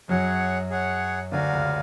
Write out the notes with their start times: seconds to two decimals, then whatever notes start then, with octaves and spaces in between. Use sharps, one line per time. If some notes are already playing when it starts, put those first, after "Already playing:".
0.08 F#2 F#3 G#4 C#5 F#5
0.70 G#4 C#5 F#5
1.31 D2 D3 F#4 A#4 D5 F5 G#5
1.52 C#2 C#3